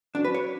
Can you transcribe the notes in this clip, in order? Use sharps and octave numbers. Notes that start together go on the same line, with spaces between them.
F#3 C#4 D4 F#4
B4
C#5